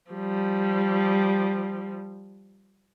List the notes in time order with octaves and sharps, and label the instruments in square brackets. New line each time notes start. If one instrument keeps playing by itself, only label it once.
[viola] F3 G3